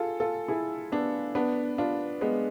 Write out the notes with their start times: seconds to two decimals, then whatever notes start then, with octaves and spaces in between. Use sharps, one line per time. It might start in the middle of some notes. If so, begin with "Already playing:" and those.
Already playing: F4 G#4 A4
0.20 F4 A4
0.48 E4 G#4
0.92 B3 D4
1.35 B3 D4
1.78 D4 F4
2.21 G#3 B3